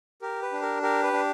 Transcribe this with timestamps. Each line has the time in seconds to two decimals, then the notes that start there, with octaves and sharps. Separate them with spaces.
0.22 G4 A#4
0.42 B4
0.52 D4
0.62 A#4
0.82 G4 A#4
1.03 B4
1.13 D4